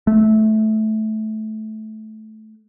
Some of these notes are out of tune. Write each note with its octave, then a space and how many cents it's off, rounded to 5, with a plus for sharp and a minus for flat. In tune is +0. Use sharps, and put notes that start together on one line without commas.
A3 -15